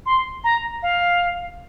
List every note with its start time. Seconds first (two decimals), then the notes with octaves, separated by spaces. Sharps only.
0.06 C6
0.44 A#5
0.83 F5